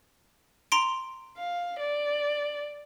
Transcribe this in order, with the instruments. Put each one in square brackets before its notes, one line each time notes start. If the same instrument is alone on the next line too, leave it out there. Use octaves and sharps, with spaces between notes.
[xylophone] A#5 C6 D7
[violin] F5
D5